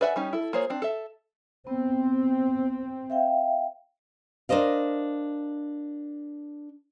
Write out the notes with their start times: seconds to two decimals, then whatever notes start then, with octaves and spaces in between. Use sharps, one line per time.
0.01 B4 D5 E5 F#5 G#5
0.16 G3 C#4 D#4
0.33 E4 A4
0.53 A#3 F4 G#4 C5 C#5
0.70 C4 D4
0.82 A4 E5
1.67 B3 C4
3.10 E5 F5 G5
4.49 D4 A#4 C5 D#5 F5